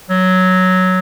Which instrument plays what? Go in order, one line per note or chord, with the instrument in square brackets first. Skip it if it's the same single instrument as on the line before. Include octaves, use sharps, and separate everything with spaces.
[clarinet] F#3